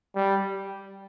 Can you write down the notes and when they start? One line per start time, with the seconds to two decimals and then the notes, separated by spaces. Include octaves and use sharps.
0.16 G3